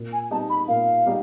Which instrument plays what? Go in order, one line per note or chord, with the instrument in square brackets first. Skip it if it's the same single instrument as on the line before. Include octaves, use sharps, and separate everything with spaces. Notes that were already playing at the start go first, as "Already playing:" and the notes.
Already playing: [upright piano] A#2
[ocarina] G#5
[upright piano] G3 B3 D#4 G#4 [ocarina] A5
[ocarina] B5
[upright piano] A#2 [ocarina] F5
[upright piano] G3 B3 D#4 G#4